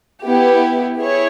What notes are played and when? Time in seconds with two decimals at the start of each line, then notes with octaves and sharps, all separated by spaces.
0.25 B3 E4 G4
0.96 E4 G#4 C#5